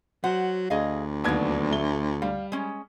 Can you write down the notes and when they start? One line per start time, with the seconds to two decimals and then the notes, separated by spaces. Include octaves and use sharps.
0.24 F#3 C5 F#5
0.70 D2 G#4 D#5 F5
1.24 D#2 F#3 B3 D5 G#6
1.71 A3 G7
2.22 G3 F5
2.52 G#3 C#4